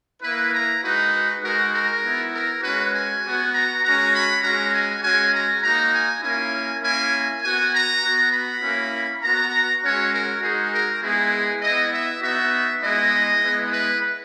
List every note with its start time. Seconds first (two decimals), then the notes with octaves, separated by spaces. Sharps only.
0.23 A#3 E4 B4
0.53 A#5
0.83 G#3 D#4 F#4 B4
1.42 G#3 D#4 F#4 A#4
1.72 A#4
2.02 B3 E4
2.32 A#4
2.62 G#3 C#4 F#4 B4
2.93 G#5
3.23 B3 F#4
3.52 A#5
3.82 G#3 C#4 F#4 A#5
4.13 B5
4.42 G#3 C#4 F#4 A#5
4.72 G#5
5.02 G#3 C#4 F#4 G#5
5.32 A#5
5.62 A#3 D#4 F#4 A#5
5.93 G#5
6.22 A#3 C#4 E4 G#5
6.82 A#3 C#4 E4 G#5
7.42 B3 F#4 G#5
7.72 A#5
8.02 B3 F#4
8.31 B5
8.62 A#3 C#4 E4
9.22 B3 F#4 A#5
9.82 G#3 C#4 F#4 C#5
10.11 A#4
10.42 G#3 D#4 F#4 G#4
10.71 A#4
11.01 G#3 B3 E4 G#4
11.61 B3 E4 D#5
11.91 E5
12.21 B3 D#4 F#4 E5
12.81 G#3 B3 E4 D#5
13.41 G#3 B3 E4
13.71 B4